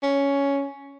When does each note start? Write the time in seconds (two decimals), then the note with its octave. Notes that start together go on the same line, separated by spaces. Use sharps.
0.03 C#4